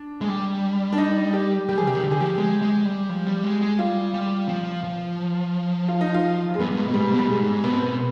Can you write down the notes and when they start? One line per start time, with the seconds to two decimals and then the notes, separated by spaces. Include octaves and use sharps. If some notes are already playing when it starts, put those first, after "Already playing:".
Already playing: D4
0.21 G#3
0.28 G3
0.93 D4
0.98 D#4
1.33 G4
1.69 G3 G4
1.78 G#4
1.86 C3 G4
1.95 D#3
2.03 D3 G4
2.11 G#4
2.21 F3 G4
2.38 G#3
2.62 G#3
2.85 G3
3.09 F3
3.27 G3
3.43 G#3
3.61 G#3
3.79 G3 F4
4.14 G3
4.49 F3
4.84 F3
5.88 F4
6.01 D#4
6.14 F4
6.54 G#3
6.59 G2 B3
6.71 G2
6.77 G#2
6.88 B2
6.94 G#2 G3
7.12 B2
7.19 G3
7.29 G#2 G#3
7.64 B2 B3
7.73 C4
7.81 B3